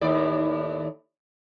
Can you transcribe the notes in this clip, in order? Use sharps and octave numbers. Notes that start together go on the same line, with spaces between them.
D#2 A2 D5